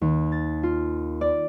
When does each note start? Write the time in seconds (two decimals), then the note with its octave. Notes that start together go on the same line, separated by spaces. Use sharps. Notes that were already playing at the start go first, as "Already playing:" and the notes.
0.01 D#2
0.32 A6
0.63 F4
1.21 D5